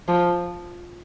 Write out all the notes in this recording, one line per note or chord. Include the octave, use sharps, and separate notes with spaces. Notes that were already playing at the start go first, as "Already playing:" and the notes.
F3